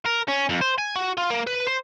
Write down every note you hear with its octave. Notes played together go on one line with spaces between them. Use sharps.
A#4
C#4
F2
C5
G#5
F#4
F4
A#3
B4
C5